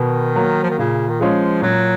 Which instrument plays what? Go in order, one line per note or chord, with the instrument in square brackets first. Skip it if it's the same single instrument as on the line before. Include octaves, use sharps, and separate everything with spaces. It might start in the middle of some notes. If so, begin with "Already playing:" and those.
Already playing: [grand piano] B2 [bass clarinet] D#3
[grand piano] F#3 A#3
[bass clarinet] F3
D#3
[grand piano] A#2 [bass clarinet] C#3
[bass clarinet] D#3
[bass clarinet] F3 [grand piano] G#3 C#4 F4 G#4
[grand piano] A#2 [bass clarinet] F#3